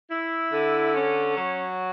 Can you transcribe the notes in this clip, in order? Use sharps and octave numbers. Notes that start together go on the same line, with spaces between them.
E4
D3
C#4
F#3